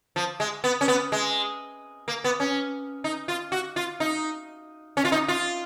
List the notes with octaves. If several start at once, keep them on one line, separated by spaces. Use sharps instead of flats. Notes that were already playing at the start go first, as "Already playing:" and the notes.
F3
G#3
B3
C#4
B3
G#3
A#3
B3
C#4
D#4
F4
F#4
F4
D#4
C#4
F4
D#4
F4